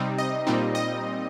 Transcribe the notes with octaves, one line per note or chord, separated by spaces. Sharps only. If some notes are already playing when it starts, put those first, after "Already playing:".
Already playing: C3 G3 C4 D#4
D#5
A#2 G3 C4 D#4
D#5